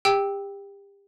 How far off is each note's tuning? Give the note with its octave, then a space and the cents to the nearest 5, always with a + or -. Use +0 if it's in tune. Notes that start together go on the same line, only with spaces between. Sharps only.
G4 +30 G5 +5 E6 -10